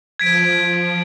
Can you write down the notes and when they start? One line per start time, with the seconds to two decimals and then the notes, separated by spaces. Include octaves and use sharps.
0.19 F3 G#6 B6 D7